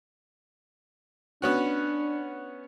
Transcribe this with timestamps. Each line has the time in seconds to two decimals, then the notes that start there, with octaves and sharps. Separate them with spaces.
1.42 B3 C#4 D4 F#4